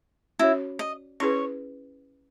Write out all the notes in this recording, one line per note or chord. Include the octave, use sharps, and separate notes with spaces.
C#4 E4 F#4 C#5
D#5
C#4 E4 G#4 B4 C#5